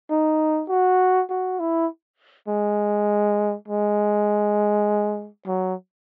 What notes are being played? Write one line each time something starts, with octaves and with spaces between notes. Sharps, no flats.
D#4
F#4
F#4
E4
G#3
G#3
F#3